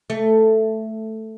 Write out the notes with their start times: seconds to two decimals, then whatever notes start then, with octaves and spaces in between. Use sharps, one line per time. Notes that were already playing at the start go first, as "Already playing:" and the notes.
0.10 A3